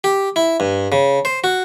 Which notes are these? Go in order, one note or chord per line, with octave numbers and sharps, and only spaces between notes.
G4
E4
G2
C#3
C5
F#4